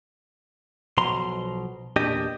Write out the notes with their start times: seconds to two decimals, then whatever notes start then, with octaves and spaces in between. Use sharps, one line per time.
0.97 B1 B2 F3 A#5 C6
1.96 E2 A#2 D4 G4 D#5